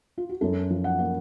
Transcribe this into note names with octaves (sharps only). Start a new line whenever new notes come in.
F4
F#4
F#2 A4
F3
F#5
A#3